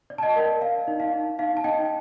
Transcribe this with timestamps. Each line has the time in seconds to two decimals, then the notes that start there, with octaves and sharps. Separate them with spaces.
0.10 D5
0.18 A5
0.23 D#5 G5
0.36 A#4
0.61 D5 F5
0.88 D#4
1.00 F5
1.13 D#4
1.39 D#4 F5
1.57 A5
1.64 D#4 D#5 G5